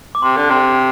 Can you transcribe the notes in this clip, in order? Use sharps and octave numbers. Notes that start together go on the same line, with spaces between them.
D6
C3 C6
D3
C3 C6